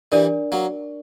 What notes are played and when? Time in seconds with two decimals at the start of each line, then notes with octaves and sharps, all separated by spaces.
0.12 E3 G3 D4 A#4 D5
0.52 F#3 A#3